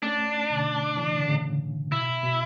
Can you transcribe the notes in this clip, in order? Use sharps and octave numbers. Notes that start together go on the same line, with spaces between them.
A3 C#4 D4
B2 D3
C#3 E3
D3
A2 C#3
B2 E4
B2